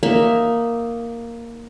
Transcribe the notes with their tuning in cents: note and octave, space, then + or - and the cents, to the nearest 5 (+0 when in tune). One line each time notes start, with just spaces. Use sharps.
A#3 +0 D#4 +0 E5 +0